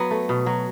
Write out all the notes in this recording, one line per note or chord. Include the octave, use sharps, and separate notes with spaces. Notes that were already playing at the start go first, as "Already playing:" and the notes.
Already playing: F#3 B3
A3
B2
F#3